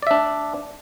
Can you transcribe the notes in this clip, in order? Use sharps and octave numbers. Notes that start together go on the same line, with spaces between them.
D4 D5 E5